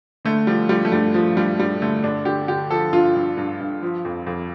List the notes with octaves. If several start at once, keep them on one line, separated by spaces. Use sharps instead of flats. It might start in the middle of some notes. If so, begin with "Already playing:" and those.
D3 A3
F3 G3
F3 G3
A3
G2 G3
F3
G2 G3
G2 G3
D3 A3
G2 D4
D3 G4
D3 G4
F3 A4
G2 F4
G2
G2
G2
F3
F2
F2